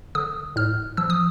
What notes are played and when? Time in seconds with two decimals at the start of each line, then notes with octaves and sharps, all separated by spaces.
0.15 D3 D#6
0.56 A2 F6
0.97 F3 E6
1.10 D#6